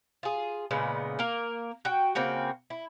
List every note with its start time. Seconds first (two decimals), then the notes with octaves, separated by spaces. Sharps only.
0.23 F4 G#4
0.71 A#2 C#3 G#3 B3
1.19 A#3 A#4
1.85 F#4 G5
2.15 C#3 A#3 C4 F#4
2.70 E4